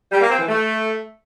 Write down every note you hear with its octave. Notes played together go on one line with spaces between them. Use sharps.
G3
A#3
C4
E3
A3